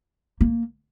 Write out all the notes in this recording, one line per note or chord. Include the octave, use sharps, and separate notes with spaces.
A#3